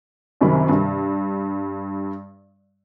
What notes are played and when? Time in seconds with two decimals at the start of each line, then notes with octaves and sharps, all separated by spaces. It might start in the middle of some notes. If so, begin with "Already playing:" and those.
0.41 C2 F#2 C3 D#3 B5
0.69 G2